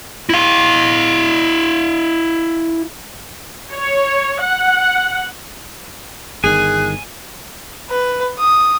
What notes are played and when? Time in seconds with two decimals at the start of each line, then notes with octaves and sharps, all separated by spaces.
0.29 E4 F5
3.73 C#5
4.43 F#5
6.44 G1 D#3 G#4 G#5 F#6
7.90 B4
8.39 D#6